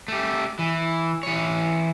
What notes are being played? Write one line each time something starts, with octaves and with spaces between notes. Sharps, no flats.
A3 G4
E3
E3 C#5